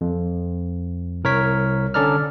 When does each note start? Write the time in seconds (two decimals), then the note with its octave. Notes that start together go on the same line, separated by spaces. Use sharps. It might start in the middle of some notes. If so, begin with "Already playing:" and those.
0.01 F2
1.24 C2 A#4 C#5 B6
1.94 D3 C#4 A4 D5 A#5 F6